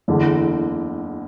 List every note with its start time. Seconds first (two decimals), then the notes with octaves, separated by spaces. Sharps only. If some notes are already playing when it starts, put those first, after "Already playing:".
0.08 F#1 E2 D3